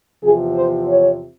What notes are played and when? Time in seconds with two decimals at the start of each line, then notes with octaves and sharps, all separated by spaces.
0.22 E2 C3 F3 G#4
0.55 C5
0.88 C#5